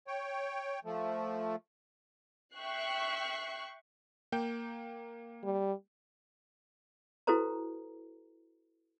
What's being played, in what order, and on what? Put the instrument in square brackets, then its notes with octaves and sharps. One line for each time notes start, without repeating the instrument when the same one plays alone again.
[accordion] C#5 G5
F3 A3
[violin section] E5 G5 C#6 F#6 C7
[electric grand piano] A#3 G5 G6
[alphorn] G3
[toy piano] E4 F#4 A4 B4 C5 A#5